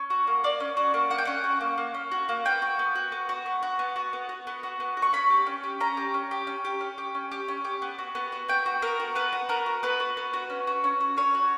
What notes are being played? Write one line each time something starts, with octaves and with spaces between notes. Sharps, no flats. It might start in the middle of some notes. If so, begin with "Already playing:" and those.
Already playing: C#4
F#4
A#3
A#3 D5
C#4
F#4
A#3
A#3 F#5
G5
C#4 F#5
F#4
A#3
A#3
C#4
F#4
A#3
B3 G5
F#4
B3
F#4
B3
F#4
B3
F#4
B3
F#4
B3
F#4
B3
F#4
B3
F#4
C#6
C#4 B5
G4
C#4
G4
C#4 A#5
G4
C#4
G4
C#4
G4
C#4
G4
C#4
G4
C#4
G4
B3
F#4
B3
F#4
B3 G5
F#4
B3 A#4
F#4
B3 B4
F#4
B3 A#4
F#4
B3 B4
F#4
B3
F#4
C#4
F#4
C#4
F#4
C#4 C#5
F#4